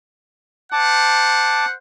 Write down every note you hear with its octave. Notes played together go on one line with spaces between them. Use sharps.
C5 F#5 A5 D6